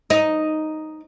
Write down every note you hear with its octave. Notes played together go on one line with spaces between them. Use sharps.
D#4